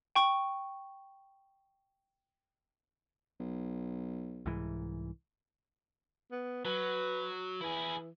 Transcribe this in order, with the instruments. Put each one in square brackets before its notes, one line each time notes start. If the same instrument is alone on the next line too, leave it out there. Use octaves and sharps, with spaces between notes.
[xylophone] G5 C#6
[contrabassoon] B1
[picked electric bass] C2 G#2 E3
[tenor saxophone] B3
[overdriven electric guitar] F#3 [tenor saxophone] B4
[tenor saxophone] E3 [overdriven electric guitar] E4 G#4